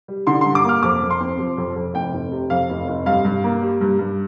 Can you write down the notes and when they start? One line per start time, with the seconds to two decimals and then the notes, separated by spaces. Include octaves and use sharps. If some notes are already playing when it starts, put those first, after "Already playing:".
0.08 G3
0.27 D3 C6
0.41 G2 C6
0.55 D6
0.64 A#3 F6
0.83 F2 D6
1.02 F2
1.10 C6
1.20 C4
1.39 F3
1.58 F2
1.76 F2
1.94 F1 G5
2.13 F1
2.32 C3
2.50 F2 F5
2.70 F1
2.88 F1
3.06 G2 F5
3.25 G2
3.44 A#3
3.62 G3
3.81 G2
3.99 G2